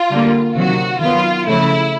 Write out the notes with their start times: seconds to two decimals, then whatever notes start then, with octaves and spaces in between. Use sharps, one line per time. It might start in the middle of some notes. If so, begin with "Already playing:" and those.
Already playing: F4
0.11 D3 G3 A#3
0.55 C3 D#3 F#3 F#4
1.00 D#3 F#3 B3 F4
1.46 C#3 F3 A3 E4